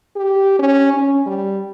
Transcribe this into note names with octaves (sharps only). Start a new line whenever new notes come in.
G4
C#4
C#4
G3